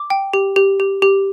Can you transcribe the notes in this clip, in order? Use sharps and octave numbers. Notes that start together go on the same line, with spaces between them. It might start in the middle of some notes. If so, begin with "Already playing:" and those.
Already playing: D6
G5
G4
G4
G4
G4